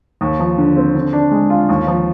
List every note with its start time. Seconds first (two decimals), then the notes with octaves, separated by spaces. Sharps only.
0.21 D#2
0.39 F3
0.58 D3
0.77 C4
0.95 D3
1.13 D4
1.31 G#3
1.50 F4
1.69 D#2
1.87 F3